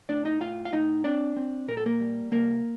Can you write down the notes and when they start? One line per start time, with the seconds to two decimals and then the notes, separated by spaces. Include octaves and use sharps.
0.09 A2 D4 D5
0.25 D#4 D#5
0.40 A2 F4 F5
0.65 F5
0.72 A2 D#4 D#5
1.04 C4 D4 D5
1.37 C4
1.68 A#2 A#4
1.77 A4
1.86 A#3 A#4
2.00 G3
2.32 C2 A#3 A#4